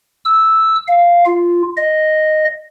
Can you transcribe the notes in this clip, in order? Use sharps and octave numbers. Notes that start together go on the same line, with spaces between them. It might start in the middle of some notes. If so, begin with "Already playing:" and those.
E6
F5
F4
D#5